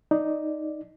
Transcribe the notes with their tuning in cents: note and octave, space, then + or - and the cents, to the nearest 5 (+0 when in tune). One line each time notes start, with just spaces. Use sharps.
D#4 +0 D5 +0